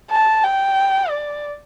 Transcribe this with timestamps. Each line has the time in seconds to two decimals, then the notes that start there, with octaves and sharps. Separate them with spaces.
0.11 A5
0.44 G5
1.10 D5